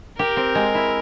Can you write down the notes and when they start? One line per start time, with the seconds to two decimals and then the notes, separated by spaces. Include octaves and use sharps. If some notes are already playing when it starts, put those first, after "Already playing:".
0.18 G4 A#4
0.37 C4
0.55 G#3
0.75 E4